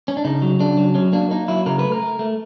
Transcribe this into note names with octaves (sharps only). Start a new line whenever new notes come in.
C#4
D4
C#3 D#4
F#3
C#3 D4
F#3
F#3 C#4
A#3 D4
A#3 D#4
F#3 E4
C#3 A#4
A3 B4
A#4
A3
A3